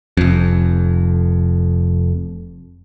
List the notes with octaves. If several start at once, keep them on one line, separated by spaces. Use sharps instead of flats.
F1 F2